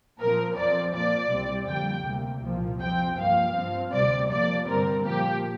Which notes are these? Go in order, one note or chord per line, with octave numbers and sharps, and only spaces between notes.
A#2 F3 C4 A#4
F2 F3 C4 D5
A#2 F3 A#3 D5
C2 C3 G3 C4
F2 D3 G3 A#3 G5
D2 C3 A#3
C2 A#2 F3 A#3
F2 F3 C4 G5
G2 F3 A#3 F5
G2 F3 C4
D2 C3 G3 C4 D5
F2 F3 A#3 D5
G2 D3 G3 C4 A#4
A#2 F3 A#3 G4